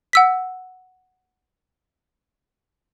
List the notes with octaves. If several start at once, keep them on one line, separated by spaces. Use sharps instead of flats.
F#5 E6 B6